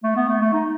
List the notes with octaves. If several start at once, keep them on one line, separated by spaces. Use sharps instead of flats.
A3
B3
A3
A3
D#4